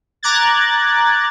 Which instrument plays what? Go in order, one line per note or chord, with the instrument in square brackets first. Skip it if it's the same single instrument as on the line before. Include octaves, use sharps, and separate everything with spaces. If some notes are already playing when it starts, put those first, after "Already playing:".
[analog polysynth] A#5 D6 F#6 G#6 A6